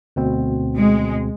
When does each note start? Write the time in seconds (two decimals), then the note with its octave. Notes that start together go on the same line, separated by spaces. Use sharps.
0.16 D2 B2 C4
0.76 G#3